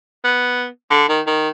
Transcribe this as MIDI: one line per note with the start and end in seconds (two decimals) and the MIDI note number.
0.24 0.67 59
0.90 1.07 50
1.09 1.21 51
1.27 1.49 51